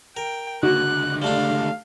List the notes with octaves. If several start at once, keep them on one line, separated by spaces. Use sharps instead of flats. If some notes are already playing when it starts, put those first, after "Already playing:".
A#4 G5
C#2 D3 F#4 F#6
G3 A3 D4 F5